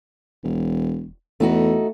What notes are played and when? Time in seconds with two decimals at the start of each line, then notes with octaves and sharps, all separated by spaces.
0.44 E1
1.40 E2 A3 D#4 F#4